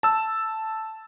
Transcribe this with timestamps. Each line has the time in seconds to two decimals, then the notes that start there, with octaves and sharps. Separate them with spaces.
0.03 A5 E6